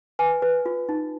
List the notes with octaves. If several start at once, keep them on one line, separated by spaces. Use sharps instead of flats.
B4 G#5
B4
F4
D#4